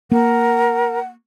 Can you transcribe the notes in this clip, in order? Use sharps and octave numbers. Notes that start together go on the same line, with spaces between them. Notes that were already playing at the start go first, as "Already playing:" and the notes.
A#3 A#4 F#5